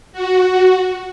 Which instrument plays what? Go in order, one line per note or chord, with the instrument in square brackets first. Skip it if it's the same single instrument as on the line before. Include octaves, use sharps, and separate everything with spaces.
[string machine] F#4